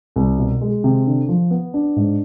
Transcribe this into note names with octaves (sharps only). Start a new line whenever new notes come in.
C2
B2
G#3
C3
D3
F3
B3
D4
G#2